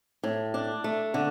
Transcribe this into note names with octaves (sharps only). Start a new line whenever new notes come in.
A2
D4
A3
D3